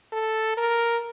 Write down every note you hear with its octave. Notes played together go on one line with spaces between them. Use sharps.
A4
A#4